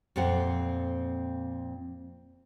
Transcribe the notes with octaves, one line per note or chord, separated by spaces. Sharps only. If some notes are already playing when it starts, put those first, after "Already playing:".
F2 A#2 C4 F#5 G5